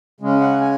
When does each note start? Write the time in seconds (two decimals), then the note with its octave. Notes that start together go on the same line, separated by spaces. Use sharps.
0.20 C#3 G#3 C#4
0.41 F#5
0.61 G#5